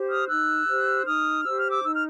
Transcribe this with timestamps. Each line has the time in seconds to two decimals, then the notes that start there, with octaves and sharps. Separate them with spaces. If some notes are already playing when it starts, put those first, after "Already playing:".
Already playing: G4 C5
0.09 D#6 F6
0.28 D#4 E6 F#6
0.67 G4 C5
1.06 D#4 D#6 F6
1.44 G4 C5 E6
1.57 F6
1.70 D6 E6
1.83 D#4 E6
1.94 F6